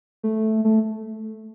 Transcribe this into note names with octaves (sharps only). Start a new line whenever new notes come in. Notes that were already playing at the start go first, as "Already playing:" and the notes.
A3
A3